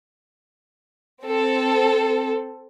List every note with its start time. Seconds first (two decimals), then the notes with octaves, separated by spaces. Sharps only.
1.21 C4 A4